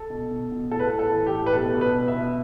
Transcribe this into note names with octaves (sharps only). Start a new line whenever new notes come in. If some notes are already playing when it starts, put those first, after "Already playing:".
Already playing: A4
B2
B2
B2
A2 A4
B4
A4
A2
A4
E3
G4
A2
B4
B2 A4
B2
B4
B2
E5
B2